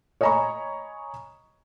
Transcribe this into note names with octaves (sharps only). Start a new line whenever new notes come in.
C#5 D#5 G#5 A#5 B5 C#6